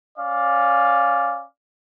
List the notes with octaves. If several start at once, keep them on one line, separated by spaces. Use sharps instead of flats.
C#4 D5 F5